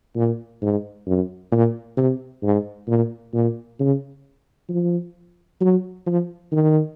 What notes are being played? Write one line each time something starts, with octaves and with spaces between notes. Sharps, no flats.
A#2
G#2
F#2
A#2
C3
G#2
A#2
A#2
C#3
F3
F#3
F3
D#3